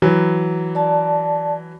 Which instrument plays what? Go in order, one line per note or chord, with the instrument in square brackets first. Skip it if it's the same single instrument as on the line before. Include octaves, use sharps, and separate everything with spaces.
[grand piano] E3 F#3
[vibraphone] D5 A5